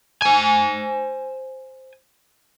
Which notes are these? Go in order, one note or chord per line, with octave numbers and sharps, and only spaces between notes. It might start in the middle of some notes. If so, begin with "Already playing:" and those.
C5 G#5